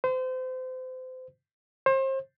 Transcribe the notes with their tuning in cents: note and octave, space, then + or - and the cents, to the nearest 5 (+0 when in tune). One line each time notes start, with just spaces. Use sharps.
C5 -30
C5 +35